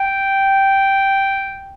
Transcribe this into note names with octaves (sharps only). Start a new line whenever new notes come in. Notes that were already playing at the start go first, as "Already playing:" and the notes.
Already playing: G5